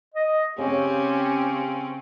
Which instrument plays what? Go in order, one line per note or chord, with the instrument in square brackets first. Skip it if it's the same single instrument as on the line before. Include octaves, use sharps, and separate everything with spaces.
[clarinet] D#5
[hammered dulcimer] C#3 [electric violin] C4 C#4 [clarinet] G4